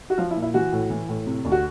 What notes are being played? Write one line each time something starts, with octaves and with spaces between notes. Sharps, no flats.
F#4
F3 F4
E4
A#2
E4
E3 F#4
A2
E3
A2
C3
D2
F#4